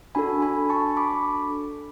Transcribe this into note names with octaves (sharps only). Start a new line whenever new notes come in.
D4 F#4 A4 G#5 B5
G#5 B5
A5 C#6
B5 D6